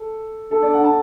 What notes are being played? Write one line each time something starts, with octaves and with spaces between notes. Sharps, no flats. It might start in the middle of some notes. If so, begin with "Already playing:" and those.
Already playing: A4
D4 A4
D5
F#5
A5